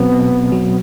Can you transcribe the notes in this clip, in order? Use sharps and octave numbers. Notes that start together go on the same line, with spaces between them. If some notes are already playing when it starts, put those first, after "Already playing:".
Already playing: B2 F#3 B3 C4
B2
B2
F#3